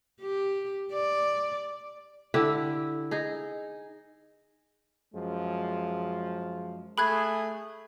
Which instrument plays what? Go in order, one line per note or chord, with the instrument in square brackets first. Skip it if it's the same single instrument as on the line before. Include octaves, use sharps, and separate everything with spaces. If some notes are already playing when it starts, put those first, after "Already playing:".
[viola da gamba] G4
D5
[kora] D3 E4 G4
D#4 G#4
[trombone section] F#2 F3 G#3
[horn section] A3 G#4 [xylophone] B5 F#6 G#6